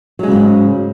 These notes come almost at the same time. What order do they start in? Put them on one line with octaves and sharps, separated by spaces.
F#3 G#3 C#3 G#2